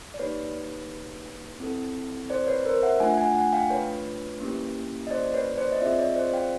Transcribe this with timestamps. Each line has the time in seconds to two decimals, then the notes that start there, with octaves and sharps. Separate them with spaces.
0.14 D5
0.19 A#3 D#4 G4 B4 C#5
1.60 C4 E4 A4
2.30 C5 D5
2.47 B4 C#5
2.65 A#4 C5
2.83 E5 F#5
3.00 A3 D4 F4 F#5 G#5
3.18 F#5 G#5
3.35 F#5 G#5
3.53 F5 G5
3.70 B4 C#5
4.40 A#3 C#4 E4 G4
5.07 D#5
5.11 C5 D5
5.34 B4 C#5
5.58 C5 D5
5.72 D#5
5.81 C4 F4 G#4 D5 E5
5.99 C#5 D#5
6.16 C5 D5
6.33 F5 G5